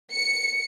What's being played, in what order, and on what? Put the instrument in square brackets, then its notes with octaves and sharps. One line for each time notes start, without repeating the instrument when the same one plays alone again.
[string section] C#7